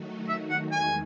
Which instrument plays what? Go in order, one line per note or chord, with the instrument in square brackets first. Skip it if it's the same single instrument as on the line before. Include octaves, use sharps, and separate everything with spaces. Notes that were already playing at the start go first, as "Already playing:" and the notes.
Already playing: [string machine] D#3 F#3 A3 D#4 F#4
[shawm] E5
F#5
[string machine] E2 D#3 G#3 [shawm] G#5